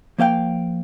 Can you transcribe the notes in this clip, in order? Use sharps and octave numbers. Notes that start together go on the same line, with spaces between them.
F3 A#3 F5 G5